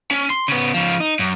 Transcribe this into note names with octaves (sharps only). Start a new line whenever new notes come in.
C#4
C6
C#3 B3
C#3 F3
D#4
F#2